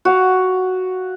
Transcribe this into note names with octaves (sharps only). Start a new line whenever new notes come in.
F#4 F5 F#5